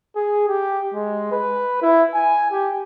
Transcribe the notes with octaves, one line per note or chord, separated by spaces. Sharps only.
G#4
G4
G#3
B4
E4
G#5
G4